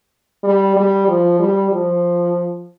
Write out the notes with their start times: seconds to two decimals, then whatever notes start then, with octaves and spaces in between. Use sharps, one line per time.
0.43 G3
0.76 G3
1.08 F3
1.39 G3
1.71 F3